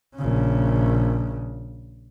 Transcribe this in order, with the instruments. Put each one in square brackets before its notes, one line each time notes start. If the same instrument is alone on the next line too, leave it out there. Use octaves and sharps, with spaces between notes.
[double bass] A#1 C#3